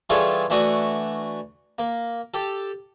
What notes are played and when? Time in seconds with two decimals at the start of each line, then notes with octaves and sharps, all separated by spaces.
0.10 E3 G3 F4 G#4 A4 C#5
0.50 E3 A3 D4 F#4 C#6 D#6
1.79 A#3
2.34 G4 A4